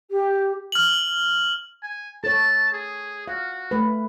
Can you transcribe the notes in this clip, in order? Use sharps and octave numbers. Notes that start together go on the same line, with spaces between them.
G4
F6 F#7
G#5
A4 C#5 A5
G#4
F#4 F5
A3 B4